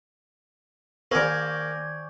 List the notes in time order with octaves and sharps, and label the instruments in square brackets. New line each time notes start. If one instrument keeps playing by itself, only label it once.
[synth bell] D#3 C#6 [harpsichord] A#3 A#4 [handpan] C5 [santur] D5 G#5 E6